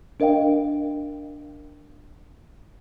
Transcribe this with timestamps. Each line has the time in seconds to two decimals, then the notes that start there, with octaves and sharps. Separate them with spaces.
0.20 D4 A#4 D#5 F5 G5